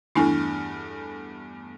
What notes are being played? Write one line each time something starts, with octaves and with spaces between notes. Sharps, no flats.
E2 G2 A3 D4 E4 G#5